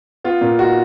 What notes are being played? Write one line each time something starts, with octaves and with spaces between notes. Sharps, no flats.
B3 F4
A#2
D#4 F#4